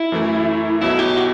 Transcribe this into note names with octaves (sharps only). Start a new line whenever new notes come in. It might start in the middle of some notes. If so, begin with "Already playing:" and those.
Already playing: E4
F#2 E3 A3
B1 B2 F#3 E4
G4
F#4